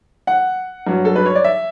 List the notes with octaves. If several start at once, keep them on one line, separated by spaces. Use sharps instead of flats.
F#5
G2 F#3
A4
B4
C#5
D5
E5